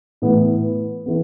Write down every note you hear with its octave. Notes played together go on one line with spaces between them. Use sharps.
A2 E3 B3
E3 B3